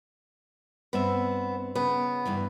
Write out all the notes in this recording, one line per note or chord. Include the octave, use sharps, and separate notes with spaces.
G2 B3 C4 E5
C#3 B3
E2 G2 E3